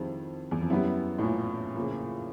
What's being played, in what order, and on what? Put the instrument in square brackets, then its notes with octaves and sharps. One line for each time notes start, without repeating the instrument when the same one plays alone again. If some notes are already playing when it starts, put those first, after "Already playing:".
Already playing: [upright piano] F2 [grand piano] D#3 G3 C4 E4 G#4
[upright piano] E2
F2
[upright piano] F#2 [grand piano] G3 B3 E4
[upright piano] A2
A#2
[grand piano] C#3 F3 A#3